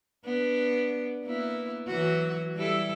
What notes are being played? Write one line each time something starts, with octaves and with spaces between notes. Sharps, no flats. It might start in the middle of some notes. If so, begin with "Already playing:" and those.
B3 D4
A#3 B3 E4
E3 F#3 F#4
G3 E4 A4